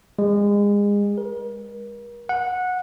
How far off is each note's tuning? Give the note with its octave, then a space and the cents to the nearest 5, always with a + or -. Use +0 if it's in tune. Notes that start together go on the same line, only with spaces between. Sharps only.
G#3 -30
A#4 +40
F#5 -15